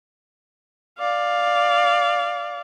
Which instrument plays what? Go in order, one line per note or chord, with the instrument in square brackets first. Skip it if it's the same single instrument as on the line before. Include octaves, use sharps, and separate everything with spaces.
[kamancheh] D5 F5